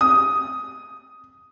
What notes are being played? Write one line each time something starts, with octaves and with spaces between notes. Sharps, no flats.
D#6